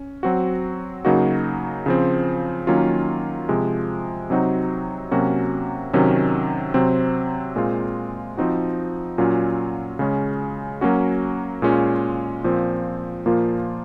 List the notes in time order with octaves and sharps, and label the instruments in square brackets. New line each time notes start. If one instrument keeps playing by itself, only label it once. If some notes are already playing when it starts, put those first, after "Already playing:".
Already playing: [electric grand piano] C#4
F#3 C4 F#4
C#3 F#3 A#3 D#4 F#4
C#3 F3 C4
D#3 F#3 A#3 C#4 F4
C3 F3 G#3
C3 F#3 C4 D#4 F#4
C3 F#3 A#3 C#4 F#4
C3 D#3 F#3 C#4
C3 F#3 C4
A#2 G#3 C4 F4
F3 C4 D#4 F#4
A#2 F#3 C#4 F4
C#3 G#3 C#4
F#3 A#3 C#4 F#4
A#2 G#3 C#4 F4
A#2 F3 C4
A#2 F3 A#3 F4